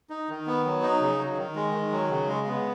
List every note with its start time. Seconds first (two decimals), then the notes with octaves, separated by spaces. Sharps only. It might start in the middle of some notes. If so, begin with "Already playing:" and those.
0.10 D#4
0.29 D#3
0.47 B3
0.66 F#3
0.83 D#4
1.01 C#3
1.19 F#3
1.37 D#3
1.56 G#3
1.74 D#3
1.92 F#3
2.10 C#3
2.28 G#3
2.47 B3